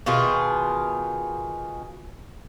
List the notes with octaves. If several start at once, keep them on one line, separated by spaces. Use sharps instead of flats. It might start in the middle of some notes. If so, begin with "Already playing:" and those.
B2 D#3 F4 G#4